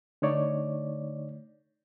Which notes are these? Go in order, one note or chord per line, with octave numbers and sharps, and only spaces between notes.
D3 A3 D#4 C#5 D5